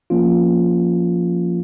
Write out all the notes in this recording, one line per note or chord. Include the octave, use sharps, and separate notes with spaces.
F3 A#3 C#4 F4